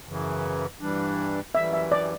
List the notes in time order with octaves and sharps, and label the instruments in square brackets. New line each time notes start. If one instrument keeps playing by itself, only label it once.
[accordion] F#2 C#3 E3
G2 E3 G3 D4
[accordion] F#2 E3 G3 [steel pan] E5
[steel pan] E5
D5